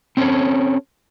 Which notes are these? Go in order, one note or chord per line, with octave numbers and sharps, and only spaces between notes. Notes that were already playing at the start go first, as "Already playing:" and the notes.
C4 C#4 A4 C5 C#5